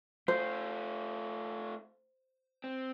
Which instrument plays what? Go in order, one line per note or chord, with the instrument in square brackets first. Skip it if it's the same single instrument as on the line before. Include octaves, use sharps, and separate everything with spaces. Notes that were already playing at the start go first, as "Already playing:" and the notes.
[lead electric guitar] A3 F4 [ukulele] C5
[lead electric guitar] C4